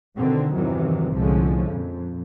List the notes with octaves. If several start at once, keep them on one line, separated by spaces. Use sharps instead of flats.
B2 D3 D#3 C4
E2 G2 C3 D#3 E3 F#3
C2 A2 D3 F3 G#3 C#4
F2 A#2